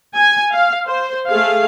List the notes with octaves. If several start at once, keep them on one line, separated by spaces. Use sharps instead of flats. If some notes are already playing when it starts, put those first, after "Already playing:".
G#5
F5
C5
A3 G#4 F5